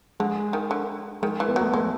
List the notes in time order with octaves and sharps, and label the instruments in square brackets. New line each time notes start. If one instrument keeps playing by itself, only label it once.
[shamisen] D3 [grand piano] G#3
[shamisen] D#3
D3
[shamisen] D#3 [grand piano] G#3
[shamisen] E3
[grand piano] B3
[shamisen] F#3
[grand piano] A3
[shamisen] G#3 [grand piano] A3